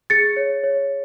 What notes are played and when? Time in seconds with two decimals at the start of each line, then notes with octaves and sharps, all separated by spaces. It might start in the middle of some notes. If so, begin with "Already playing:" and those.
0.10 G#4 A6 C#7
0.37 C#5
0.64 C#5